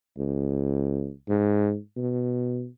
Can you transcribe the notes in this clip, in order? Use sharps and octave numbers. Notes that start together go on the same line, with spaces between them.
C#2
G#2
B2